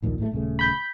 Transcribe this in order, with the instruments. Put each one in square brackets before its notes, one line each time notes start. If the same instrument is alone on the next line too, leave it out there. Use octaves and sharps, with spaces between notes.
[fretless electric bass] A#1 D#2 A#2
A2 D#3 A3
D#1 C#3 A3
[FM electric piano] B5 G6